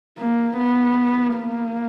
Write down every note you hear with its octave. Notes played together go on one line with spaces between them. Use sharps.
A#3
B3
A#3